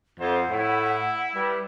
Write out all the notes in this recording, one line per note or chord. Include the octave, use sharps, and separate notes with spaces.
F2 C5 F#5
A2 E4
G3 B4